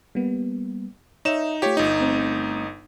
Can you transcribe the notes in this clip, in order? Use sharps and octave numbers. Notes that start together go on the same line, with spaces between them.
G3 A#3 B3
D#4 C#5 E5 E7
A3 F4 G4 C#5
G1 D#4
A3 C4